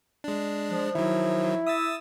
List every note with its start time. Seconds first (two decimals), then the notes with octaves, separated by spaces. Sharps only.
0.24 G#3 D4
0.71 F3
0.95 D#3 F#3 E4
1.67 E5 D#6 E6 A6